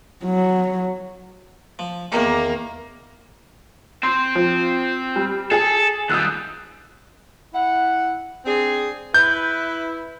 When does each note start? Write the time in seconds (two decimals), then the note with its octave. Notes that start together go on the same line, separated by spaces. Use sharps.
0.25 F#3
1.79 F3
2.12 E2 D#3 A#3 G4
4.03 C4 C6
4.35 F3
5.16 G3
5.51 G#4 A4
6.10 D#2 G3 D#6 E6 F#6
7.53 E4 F#5
8.46 C4 D4 G#4
9.14 E4 B4 G6